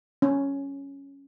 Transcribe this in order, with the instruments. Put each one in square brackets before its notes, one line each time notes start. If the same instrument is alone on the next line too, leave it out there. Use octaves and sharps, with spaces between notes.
[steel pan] C#4